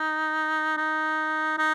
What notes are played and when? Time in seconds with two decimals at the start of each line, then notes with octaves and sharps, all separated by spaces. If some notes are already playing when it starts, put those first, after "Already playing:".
Already playing: D#4
0.77 D#4
1.58 D#4